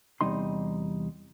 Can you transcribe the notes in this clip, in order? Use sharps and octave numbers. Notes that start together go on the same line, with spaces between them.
E2 A2 C3 G3 D#4 C6